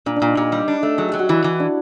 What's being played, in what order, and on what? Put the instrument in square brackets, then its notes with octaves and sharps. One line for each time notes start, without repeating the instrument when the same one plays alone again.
[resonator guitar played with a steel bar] A#2 [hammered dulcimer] D4
[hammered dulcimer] D4
[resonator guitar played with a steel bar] A#2
[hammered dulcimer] D#4
[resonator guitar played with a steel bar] A#2 [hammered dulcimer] G4
[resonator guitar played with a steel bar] G3
D4
A3
[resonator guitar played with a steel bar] F#3 [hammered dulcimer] G#4
[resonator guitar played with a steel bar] F#3 [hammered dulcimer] G4
[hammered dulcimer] F#4
[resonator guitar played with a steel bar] E3 [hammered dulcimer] E4
[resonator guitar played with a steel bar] E3
[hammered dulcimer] D4